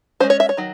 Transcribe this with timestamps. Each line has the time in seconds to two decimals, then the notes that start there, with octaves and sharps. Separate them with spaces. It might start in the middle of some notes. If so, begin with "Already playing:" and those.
0.20 G#3 C#4 C5
0.30 C#5
0.40 E5
0.49 C#5
0.57 D#3 F#3